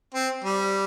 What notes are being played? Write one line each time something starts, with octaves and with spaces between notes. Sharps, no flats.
C4
G3